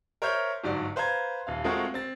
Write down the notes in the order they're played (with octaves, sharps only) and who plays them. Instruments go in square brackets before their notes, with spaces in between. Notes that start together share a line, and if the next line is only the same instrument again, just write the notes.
[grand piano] A#4 C5 C#5 E5 F6 G6
G1 G#2 F#3 D5
B4 C5 F5 A#5 G#6
D#1 F5
G#3 A3 C4 F4 F#4 A#4
C4 A6